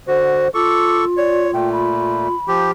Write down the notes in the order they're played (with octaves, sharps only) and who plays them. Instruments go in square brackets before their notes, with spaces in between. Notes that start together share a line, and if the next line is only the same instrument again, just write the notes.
[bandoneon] D3 F#4 [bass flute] C5
[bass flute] F4 [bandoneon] A4 C#6 [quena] D6
[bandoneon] C#5 [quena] D5
[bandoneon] A#2 A3 [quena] G5
[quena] B5
[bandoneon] F3 G4